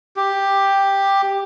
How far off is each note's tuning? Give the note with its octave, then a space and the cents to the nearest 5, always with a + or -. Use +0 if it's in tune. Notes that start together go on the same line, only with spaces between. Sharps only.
G4 +5